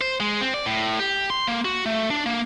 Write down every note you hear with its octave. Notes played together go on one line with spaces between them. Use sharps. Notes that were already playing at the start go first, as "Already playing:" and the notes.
C5
G#3
C4
D5
A2
G4
C6
A#3
F#4
A3
D4
A#3